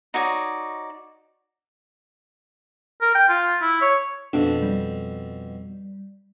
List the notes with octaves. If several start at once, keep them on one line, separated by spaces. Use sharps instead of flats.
D#4 F#4 C#5 D5
A#4
G5
F4
E4
C#5
F2 B2 D4
G3